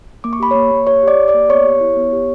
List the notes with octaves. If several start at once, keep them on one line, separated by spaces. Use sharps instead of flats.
A#3 D6
C#6
G4 B5
A#3 C#5 C#6
A#3
G4 C#5 C#6
G4 D5 D6
G4
D5 D6
A#3
B3 C#5 C#6
G4
E4
B3
G4